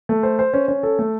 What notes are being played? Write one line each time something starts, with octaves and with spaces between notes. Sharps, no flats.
A3
C5
C5
C#4
C#4
A4
A3